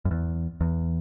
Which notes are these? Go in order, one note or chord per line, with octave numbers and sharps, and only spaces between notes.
F#2
E2
E2